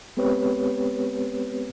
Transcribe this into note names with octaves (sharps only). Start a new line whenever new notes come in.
G#3 B3 C4 G4 B4 C#5